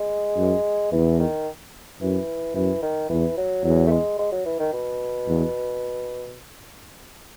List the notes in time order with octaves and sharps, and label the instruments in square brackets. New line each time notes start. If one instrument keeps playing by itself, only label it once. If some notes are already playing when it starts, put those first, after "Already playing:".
Already playing: [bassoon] G#3
[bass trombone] F#2
[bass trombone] E2 [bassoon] E3
[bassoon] D#3
[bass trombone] F#2 [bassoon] E3
[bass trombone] F#2 [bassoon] E3
[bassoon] D#3
[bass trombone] E2 [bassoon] E3
[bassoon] F#3
[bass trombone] E2 [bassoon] F#3
[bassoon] A3
G#3
G#3
F#3
E3
D#3
B2
[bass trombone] E2